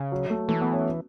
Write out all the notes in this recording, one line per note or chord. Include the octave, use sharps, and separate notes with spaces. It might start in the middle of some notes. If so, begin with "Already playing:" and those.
Already playing: C#3
F#3
A3
E3 A3
B3
C#4